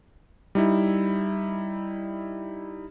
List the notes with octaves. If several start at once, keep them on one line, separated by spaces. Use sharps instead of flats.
G3 D#4 E4